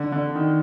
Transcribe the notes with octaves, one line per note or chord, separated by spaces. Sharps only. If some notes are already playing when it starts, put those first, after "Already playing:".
Already playing: D3
D3
D#3